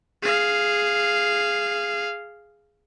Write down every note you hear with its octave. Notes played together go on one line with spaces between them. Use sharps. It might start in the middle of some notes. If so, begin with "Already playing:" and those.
G#4 F5